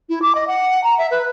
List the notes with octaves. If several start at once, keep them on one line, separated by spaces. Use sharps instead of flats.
E4
D6
D#5
F#5
A#5
E5
B4